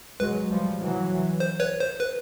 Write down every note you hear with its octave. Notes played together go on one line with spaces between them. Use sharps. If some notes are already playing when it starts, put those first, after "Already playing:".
F#3 G#3 B4
F3 G3
E3 F#3
C5
B4 C#5
C5
B4